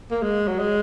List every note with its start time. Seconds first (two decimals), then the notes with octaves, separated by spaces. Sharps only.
0.11 A#3
0.22 G#3
0.48 F#3
0.59 G#3